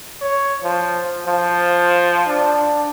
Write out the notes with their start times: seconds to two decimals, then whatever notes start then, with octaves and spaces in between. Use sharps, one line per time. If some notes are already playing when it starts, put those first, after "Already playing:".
0.21 C#5
0.63 F3
1.26 F3
2.28 D4